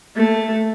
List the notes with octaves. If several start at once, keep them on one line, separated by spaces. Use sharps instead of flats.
A3